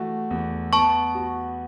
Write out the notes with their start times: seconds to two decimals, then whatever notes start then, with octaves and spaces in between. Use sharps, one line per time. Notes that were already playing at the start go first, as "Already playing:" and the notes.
Already playing: E3 A3 F#4
0.31 E2
0.73 B3 A5 C#6
1.15 F#4